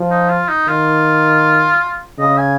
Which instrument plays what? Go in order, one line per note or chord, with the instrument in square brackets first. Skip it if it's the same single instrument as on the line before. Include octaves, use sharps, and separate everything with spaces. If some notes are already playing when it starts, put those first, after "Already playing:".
Already playing: [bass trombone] F3
[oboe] D#4
F4
D#4
[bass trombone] D#3 [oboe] F4
[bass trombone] C#3 [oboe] D#5
[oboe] G#5